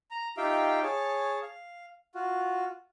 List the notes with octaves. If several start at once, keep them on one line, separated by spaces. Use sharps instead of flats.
A#5
D#4 F4 G4 E5 F5 G5
G#4 C#5 A5
F5
F4 F#4